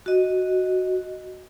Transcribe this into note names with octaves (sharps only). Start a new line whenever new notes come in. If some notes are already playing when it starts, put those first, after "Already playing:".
F#4 D#5